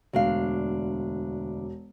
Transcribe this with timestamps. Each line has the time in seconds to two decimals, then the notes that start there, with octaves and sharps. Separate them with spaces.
0.13 E1 D2 D4 F5